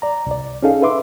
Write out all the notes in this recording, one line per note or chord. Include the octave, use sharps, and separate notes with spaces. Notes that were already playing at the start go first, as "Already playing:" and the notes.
D5 A#5
C2 D5
C#4 D#4 G#4 A4 F5
B4 E5 C6 D6